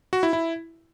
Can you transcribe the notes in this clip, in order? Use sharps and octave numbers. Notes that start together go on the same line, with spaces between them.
F#4
E4
E4